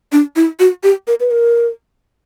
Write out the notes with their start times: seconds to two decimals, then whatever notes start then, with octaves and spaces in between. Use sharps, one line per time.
0.12 D4
0.36 E4
0.60 F#4
0.83 G4
1.07 A#4
1.20 B4
1.31 A#4